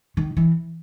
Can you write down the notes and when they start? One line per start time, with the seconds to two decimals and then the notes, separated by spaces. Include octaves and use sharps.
0.17 D#3
0.37 E3